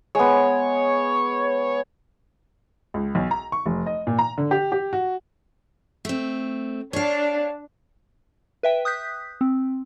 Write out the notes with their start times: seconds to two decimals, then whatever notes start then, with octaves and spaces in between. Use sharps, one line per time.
0.15 G#3 B3 C#5
2.94 C#2
3.15 B1
3.31 A#5
3.52 C#6
3.66 F1
3.86 D#5
4.07 A#2
4.19 A#5
4.38 D3
4.51 G4
4.72 G4
4.93 F#4
6.05 A3 C4
6.93 D4 C#5 F5
8.63 B4 E5 G5
8.85 D#6 F#6 G6 B6
9.41 C4